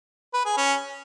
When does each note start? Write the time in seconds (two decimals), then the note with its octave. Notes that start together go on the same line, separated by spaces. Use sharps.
0.34 B4
0.46 G#4
0.57 C#4